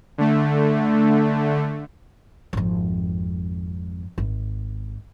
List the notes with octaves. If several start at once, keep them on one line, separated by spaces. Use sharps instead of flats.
D3 A3
G#1 F2
G#1